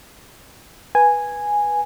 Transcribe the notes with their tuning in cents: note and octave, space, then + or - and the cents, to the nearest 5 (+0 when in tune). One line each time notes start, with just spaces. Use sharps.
B4 -10 G#5 -5